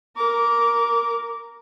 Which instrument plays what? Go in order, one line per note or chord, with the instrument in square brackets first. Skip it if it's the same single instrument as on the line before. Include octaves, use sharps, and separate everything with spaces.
[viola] A#4 D6